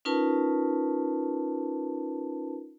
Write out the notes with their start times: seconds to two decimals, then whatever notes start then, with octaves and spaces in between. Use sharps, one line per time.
0.05 C#4 D#4 F4 A#4 B4 A5